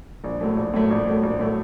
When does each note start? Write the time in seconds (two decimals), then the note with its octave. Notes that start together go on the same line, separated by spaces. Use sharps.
0.24 A#1
0.41 A2 F#3 A3
0.57 A#1
0.74 A2 F#3 A3
0.91 A#1
1.07 A2 F#3 A3
1.23 A#1
1.39 A2 F#3 A3